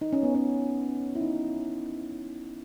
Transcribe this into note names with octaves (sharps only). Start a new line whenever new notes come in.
D#4
C#4
B3
C#4
E4
D#4